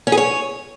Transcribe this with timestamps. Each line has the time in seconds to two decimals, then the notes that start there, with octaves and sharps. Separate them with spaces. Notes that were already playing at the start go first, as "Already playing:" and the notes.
0.07 C#4
0.12 G#4
0.17 C#5